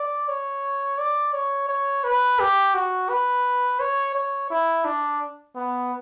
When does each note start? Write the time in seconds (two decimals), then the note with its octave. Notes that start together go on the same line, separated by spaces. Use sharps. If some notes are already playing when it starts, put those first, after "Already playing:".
Already playing: D5
0.28 C#5
0.99 D5
1.33 C#5
1.69 C#5
2.04 B4
2.40 G4
2.74 F#4
3.09 B4
3.80 C#5
4.15 C#5
4.50 E4
4.85 D4
5.56 B3